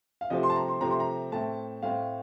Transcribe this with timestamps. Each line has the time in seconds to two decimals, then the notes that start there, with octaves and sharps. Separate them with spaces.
0.21 F5
0.30 C3 F3 A3 C4 D#5
0.43 C6
0.50 A5
0.56 A#5
0.68 C6
0.81 C3 F3 A3 C4 A#5
0.91 C6
1.00 A#5
1.32 A2 A3 C4 A5
1.82 A2 A3 C4 F5